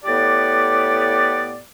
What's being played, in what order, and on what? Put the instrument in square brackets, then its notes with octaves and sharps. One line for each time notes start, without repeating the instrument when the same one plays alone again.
[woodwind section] A2 B3 G4 D5